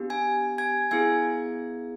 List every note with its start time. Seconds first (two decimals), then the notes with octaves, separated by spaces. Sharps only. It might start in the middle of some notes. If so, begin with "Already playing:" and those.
Already playing: B3 D4 G4
0.10 G#5 G#6
0.58 G#5 G#6
0.91 B3 E4 G#4 G#5 G#6